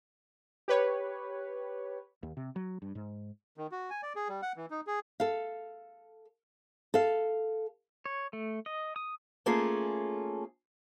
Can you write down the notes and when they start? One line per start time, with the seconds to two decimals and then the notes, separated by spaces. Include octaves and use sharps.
0.68 G4 B4 C#5
2.23 D#2
2.37 C3
2.56 F#3
2.82 G2
2.95 G#2
3.57 D#3
3.72 F#4
3.90 G#5
4.03 D5
4.16 G#4
4.28 G3
4.42 F#5
4.56 E3
4.71 D#4
4.87 G#4
5.20 A4 F5
6.94 A4 F5
8.06 C#5
8.33 A3
8.66 D#5
8.96 D#6
9.46 A3 A#3 C#4 F4 G#4 A4